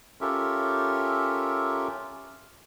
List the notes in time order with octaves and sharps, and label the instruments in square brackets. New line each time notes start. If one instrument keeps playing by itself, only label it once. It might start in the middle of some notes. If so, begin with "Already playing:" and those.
[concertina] C#4 F4 G4 A4 A#4 E5